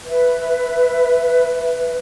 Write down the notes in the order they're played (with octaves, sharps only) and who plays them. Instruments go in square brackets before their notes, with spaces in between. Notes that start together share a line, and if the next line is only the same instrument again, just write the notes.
[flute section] B4 E5